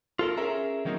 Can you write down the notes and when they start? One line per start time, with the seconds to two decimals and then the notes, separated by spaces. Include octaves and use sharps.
0.19 F4 A4 A#4
0.37 C#4 G#4 A#4 E5 A#5
0.85 D#3 F#3 A#3 C4 D#4